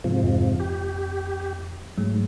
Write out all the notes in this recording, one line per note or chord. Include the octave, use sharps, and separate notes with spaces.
G#2 C3 F3
F2
G4
G#2 F#3 A3